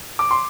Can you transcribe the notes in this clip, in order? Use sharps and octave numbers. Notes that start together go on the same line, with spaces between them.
D6
C6